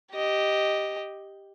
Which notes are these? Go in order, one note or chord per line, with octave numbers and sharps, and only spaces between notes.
G4 D#5